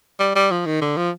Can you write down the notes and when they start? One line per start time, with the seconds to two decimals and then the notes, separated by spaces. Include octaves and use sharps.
0.20 G3
0.36 G3
0.51 F3
0.66 D#3
0.81 D3
0.97 F3